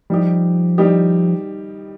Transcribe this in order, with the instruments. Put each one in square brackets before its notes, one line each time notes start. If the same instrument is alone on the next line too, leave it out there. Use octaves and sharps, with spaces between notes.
[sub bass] F3 [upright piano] G3 D#4 G4
[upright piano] G3 D#4 G4